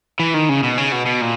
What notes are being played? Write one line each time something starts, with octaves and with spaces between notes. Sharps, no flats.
E3
D#3
C#3
B2
C#3
B2
B2
A#2